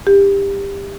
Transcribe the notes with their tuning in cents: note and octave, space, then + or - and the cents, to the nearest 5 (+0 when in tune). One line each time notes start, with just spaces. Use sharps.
D#4 -25 G4 +20